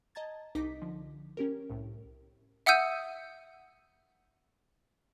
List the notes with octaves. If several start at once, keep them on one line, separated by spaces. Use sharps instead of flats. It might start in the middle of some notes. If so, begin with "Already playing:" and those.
D#5 A5 A#5 G#6 A6
C2 D#4 D#5 D6 B6
D3 F3
C#4 G4 A#4
C2 A2
E5 F#5 D#6 E6 G6 D#7